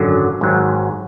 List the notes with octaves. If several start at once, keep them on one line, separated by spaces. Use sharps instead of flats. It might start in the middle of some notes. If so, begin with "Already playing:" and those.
Already playing: G#1 F#2 D3 F#3
G#1 G#2 F#3